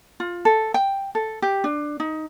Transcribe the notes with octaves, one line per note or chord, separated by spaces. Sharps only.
F4
A4
G5
A4
G4
D4
D#4